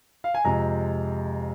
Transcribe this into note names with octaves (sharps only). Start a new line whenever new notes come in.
F5
G#5
F2 C3 G#3 A#5